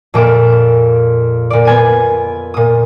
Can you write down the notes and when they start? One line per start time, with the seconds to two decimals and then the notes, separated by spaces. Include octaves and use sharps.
0.14 F2 A#2 D6 E7
1.50 A#2 D5
1.65 B3 G#5 D#7
2.54 A#2 D#6